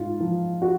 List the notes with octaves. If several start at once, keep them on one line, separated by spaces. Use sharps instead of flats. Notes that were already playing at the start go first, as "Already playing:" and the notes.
Already playing: G#2 F4
F3
F#4